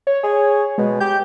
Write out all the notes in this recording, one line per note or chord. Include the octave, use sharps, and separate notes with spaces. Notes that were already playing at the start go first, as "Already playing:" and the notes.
C#5
G#4
B2 G#3
G4 G6